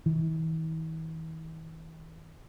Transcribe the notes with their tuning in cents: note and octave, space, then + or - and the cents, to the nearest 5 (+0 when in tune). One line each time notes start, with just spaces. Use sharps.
E3 -45